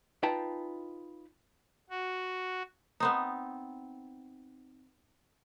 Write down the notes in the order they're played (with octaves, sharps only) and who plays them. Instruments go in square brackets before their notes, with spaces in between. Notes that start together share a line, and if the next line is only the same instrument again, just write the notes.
[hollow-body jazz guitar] D#4 F4 B4 G5 A5 A#5
[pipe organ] F#4
[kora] B3 C4 D#4